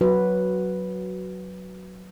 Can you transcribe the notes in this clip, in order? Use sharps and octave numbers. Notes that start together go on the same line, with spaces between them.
F#3 F#4 B4